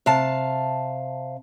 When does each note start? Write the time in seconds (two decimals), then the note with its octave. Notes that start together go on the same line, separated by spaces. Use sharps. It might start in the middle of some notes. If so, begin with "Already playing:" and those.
0.06 C3 F5 A5